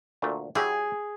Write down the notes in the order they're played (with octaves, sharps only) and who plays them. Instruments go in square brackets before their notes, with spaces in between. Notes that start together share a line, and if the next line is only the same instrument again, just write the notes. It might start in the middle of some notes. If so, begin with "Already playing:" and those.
[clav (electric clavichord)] D2 A#2 A3
[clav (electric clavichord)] F#3 E4 G4 [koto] G#4